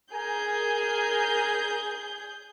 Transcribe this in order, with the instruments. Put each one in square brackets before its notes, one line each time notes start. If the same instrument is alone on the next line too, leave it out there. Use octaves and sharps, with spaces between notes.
[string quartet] G#4 G6 [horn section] A#4 G#5